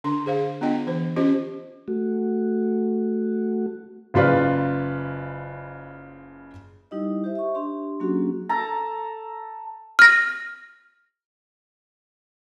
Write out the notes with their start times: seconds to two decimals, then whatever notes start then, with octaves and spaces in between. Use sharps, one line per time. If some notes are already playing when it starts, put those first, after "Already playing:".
0.04 D3 D4 C6
0.26 G#4 C5 F5
0.61 B3 D4 F4 D#5 G5
0.87 E3 C5
1.16 C#4 F4 G4 C5 D#5
1.88 A3 F#4
4.14 F#1 C#3 F4 B4 D5
6.91 G3 D#4 E4 G4 D#5
7.24 G4 C5 E5
7.35 E5 C#6
7.55 D4 G4 C6
8.00 F#3 A#3 C#4 D4 F#4 G#4
8.49 A4 A5 A#5
9.99 F6 A#6